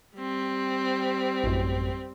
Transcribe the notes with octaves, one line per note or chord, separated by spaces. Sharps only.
G3 C4
A1 F#2